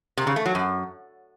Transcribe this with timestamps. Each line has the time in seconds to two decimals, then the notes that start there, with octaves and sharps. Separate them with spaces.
0.17 C3
0.27 C#3
0.36 A3
0.46 F#3
0.55 F#2